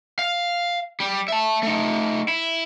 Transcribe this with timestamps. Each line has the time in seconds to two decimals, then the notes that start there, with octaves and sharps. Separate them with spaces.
0.19 F5
1.00 G3
1.28 E5 A5
1.63 A3 D#4
2.28 E4